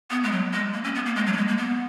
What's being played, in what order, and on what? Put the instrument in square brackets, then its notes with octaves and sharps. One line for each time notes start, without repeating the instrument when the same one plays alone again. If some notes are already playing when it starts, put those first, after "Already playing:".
[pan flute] B3
G#3
F#3
G#3
A#3
C#4
B3
A#3
G#3
F#3
A#3
G#3
A#3
B3